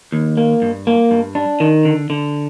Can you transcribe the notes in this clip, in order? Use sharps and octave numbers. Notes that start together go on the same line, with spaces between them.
D#2
A#3
G2
A#3
G2
D4
D#3
D3
D3